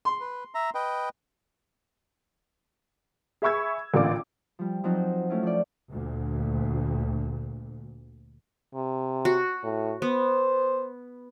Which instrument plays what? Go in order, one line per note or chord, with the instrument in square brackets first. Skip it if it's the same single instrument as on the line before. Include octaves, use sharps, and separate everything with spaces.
[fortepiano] C6
[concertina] B4
E5 A#5
B4 D#5 G5
[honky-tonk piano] G#4 E5 B5 C#6 E6 G#6
A1 A#2 D3 F4 D5 D6
[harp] F3 G3
F3 F#3 C4 D#4 F#4
A3 C#4 E4 F4
F3 D5
[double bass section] D2 A#2
[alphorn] C3
[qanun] F#4
[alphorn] A2
[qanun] B3 [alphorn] C5